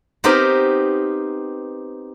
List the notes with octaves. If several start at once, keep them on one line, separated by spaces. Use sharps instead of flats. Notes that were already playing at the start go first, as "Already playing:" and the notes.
B3 C4 D#4 G4 A#4